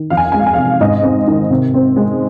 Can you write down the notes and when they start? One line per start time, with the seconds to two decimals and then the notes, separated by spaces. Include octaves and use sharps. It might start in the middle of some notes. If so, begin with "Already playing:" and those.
Already playing: D#3
0.10 F2 F5
0.17 G#5
0.25 F5
0.32 G#3 G#5
0.39 F5
0.46 G#5
0.53 F5
0.57 C3
0.80 G#2 D#5
1.03 C4
1.27 D#3
1.51 C3
1.74 C4
1.96 G#3